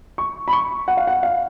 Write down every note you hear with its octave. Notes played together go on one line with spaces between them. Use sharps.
C#6
B5
C#6
F#5
F5
F#5
F5